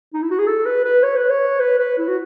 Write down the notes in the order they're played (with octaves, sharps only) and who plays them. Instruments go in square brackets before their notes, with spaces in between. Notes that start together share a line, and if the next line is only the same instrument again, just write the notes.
[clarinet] D#4
E4
F#4
G#4
A4
B4
B4
C#5
B4
C#5
B4
B4
E4
F#4